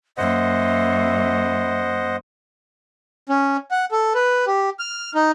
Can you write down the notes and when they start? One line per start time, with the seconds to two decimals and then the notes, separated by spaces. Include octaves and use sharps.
0.18 F#2 A#3 C5 D#5 E5 F#5
3.29 C#4
3.71 F#5
3.91 A4
4.14 B4
4.47 G4
4.79 F6
5.15 D#4